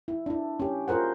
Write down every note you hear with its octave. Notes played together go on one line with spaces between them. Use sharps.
E4
D4 E4
C#4 G4
F4 G#4 A#4 C5 F#5